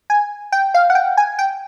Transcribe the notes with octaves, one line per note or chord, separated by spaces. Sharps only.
G#5
G5
F5
F#5
G5
G#5
G5